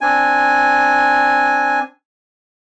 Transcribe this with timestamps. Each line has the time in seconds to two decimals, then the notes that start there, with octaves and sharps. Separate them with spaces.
0.01 C4 D4 G#5